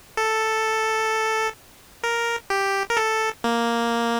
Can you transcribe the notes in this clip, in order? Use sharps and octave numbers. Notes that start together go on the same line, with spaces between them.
A4
A#4
G4
A#4
A4
A#3